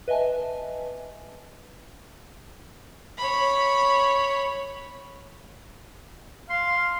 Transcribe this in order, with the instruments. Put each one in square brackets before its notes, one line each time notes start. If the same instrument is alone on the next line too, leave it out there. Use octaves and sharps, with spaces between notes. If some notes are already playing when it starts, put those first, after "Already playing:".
[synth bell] B4 D#5 E5 G#5 A5
[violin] C#5 B5
[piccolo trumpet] F5 [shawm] C6